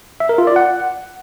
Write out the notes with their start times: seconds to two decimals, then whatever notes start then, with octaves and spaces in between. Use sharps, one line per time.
0.20 E5
0.29 A#4
0.38 F4
0.47 D5
0.56 F#5